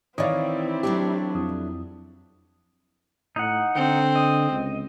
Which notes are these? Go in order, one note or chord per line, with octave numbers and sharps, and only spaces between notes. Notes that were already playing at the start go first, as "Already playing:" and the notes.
D#3 E3 C4 E4 C#5 D5 F5 D#6
F#3 A3 D4 G4
F2 E4 D#6
A2 D#4 F#5
D3 C4
D#5
C#2